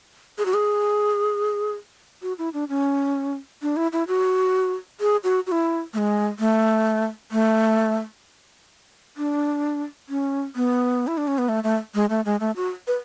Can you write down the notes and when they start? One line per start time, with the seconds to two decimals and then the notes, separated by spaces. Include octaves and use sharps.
0.38 G#4
0.46 F#4
0.54 G#4
2.22 F#4
2.38 E4
2.54 D4
2.69 C#4
3.62 D4
3.77 E4
3.93 E4
4.08 F#4
5.01 G#4
5.24 F#4
5.47 F#4
5.52 E4
5.94 A3
5.98 G#3
6.39 A3
7.32 A3
9.17 D4
10.09 C#4
10.56 B3
11.07 E4
11.18 D4
11.28 C#4
11.38 B3
11.49 A3
11.64 A3
11.95 G#3
12.10 A3
12.25 G#3
12.40 A3
12.56 F#4
12.87 B4